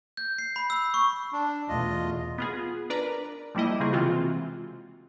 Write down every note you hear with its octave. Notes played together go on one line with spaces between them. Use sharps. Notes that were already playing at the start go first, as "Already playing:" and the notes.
G6
C7
B5
E6
C#6
D4
E2 B2 A3 F4 D#5
B3 F4 G#4
D4 A#4 B4 D5 A#5
F3 G3 A#3 E4 D#5
C#3 A#3 C4 G#4
C3 E3 G#3 C4 F4 F#4